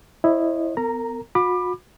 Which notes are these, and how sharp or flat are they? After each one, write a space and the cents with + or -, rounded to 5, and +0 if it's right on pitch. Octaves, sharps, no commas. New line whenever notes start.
E4 +0 C5 +45 D#5 -15
B3 +30 A#4 -35 A#5 +0
F#4 -40 B5 +0 D6 +25